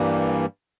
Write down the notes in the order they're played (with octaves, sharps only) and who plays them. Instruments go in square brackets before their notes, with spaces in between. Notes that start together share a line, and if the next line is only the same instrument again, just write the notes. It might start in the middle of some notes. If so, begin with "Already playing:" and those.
Already playing: [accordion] G2 E3 G3 A#3